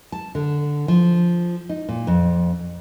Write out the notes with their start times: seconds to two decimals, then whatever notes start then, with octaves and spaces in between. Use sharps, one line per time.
0.12 A5
0.35 D3
0.88 F3
1.69 D#4
1.89 A#2
2.07 F2